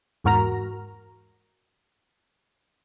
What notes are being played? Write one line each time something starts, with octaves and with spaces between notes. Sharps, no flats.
E2 G#2 F#4 A#4 A#5